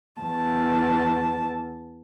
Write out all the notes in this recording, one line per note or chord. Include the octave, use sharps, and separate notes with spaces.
E2 A5